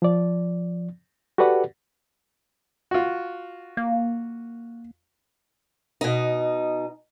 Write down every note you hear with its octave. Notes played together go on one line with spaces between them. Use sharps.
F3 D5
F#4 G4 A4 B4 D5 F#5
F4 F#4
A#3
B2 D#4